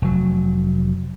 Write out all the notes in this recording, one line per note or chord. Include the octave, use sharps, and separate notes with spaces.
F1 F#3